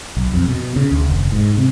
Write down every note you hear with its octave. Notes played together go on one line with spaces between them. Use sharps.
B1
F2
B2
C#3
D2
F1
G#2
C3